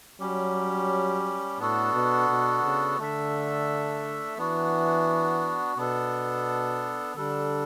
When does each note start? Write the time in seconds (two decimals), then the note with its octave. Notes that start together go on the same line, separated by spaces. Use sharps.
0.20 F#3 G3 C#4 G4
1.59 A2 B3 D4 F#4 A4
1.94 B2
2.29 B2
2.63 C#3
2.99 D3 A3 D4 A4 E5
4.37 E3 B3 D4 F#4
5.77 B2 B3 D4 A4
7.16 D3 G3 D4 A4